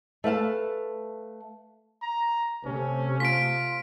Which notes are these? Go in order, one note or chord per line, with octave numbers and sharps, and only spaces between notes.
A3 B4 F5 A5
A#5
C3 A3 C#4
F4 B6 D7